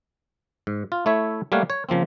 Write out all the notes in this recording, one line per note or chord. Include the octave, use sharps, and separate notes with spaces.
G#2
F4
A3 E4 C#5 E5
G3 A3 A#3 C#5 F5 F#5
C#5
C#3 F3 A#3 C4